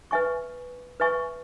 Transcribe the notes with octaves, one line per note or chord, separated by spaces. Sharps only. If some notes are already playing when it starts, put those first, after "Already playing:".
B4 E5 G#5 C#6
B4 E5 G#5 C#6